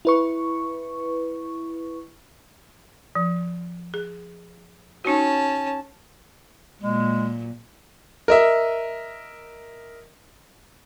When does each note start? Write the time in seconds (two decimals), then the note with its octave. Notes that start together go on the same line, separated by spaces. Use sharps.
0.05 E4 B4 C#6
3.15 F3
3.94 G#4
5.05 C#4 D#4 F#4 A5
6.81 A#2 F#3 G#3
8.28 A#4 D#5 E5